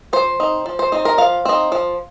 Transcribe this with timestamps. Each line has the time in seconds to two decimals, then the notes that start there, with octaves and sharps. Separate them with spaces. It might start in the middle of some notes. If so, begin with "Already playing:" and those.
0.13 F3 C5
0.40 C4 D#4
0.66 F3
0.79 C5
0.92 C4 D#4 C5
1.05 A#4
1.18 F3 F5
1.45 C4 D#4
1.72 F3